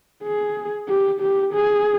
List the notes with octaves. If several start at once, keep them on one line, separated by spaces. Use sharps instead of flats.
G#4
G4
G4
G#4